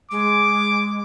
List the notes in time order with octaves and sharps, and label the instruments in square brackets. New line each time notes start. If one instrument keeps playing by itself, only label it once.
[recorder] G#3 [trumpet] D6